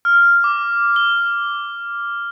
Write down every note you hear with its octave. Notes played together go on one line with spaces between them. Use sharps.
F6
D6
G7